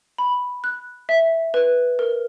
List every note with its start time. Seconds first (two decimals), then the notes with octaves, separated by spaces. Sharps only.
0.18 B5
0.64 F#6
1.09 E5
1.54 B4
1.99 A#4